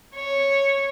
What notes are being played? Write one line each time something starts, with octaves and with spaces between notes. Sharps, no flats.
C#5